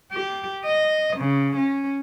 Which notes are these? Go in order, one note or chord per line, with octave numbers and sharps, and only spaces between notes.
G4
D#5
C#3
C#4